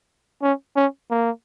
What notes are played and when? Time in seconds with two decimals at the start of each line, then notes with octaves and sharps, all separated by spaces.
0.42 C#4
0.76 C#4
1.10 A#3